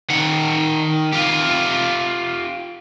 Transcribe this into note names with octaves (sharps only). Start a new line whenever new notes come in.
D#3 F#5
F4 G4